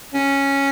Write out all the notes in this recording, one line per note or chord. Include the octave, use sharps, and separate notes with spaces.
C#4